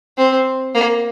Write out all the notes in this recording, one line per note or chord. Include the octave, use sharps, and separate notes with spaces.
C4
A#3